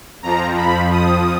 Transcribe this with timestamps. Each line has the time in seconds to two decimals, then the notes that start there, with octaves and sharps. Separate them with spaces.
0.23 F2 F3 A#5
0.57 B5
0.91 D#6